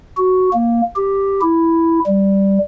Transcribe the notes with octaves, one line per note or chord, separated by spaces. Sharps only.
F#4
A#3
G4
E4
G3